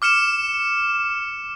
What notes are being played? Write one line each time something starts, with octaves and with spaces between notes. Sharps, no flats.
D6 F6 C#7 E7